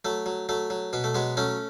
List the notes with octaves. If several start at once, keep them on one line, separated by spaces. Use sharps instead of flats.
F#3 A3
F#3
F#3 A3
F#3
B2 B3
A3
F#3 G#3 B3
F#3 A3 C#4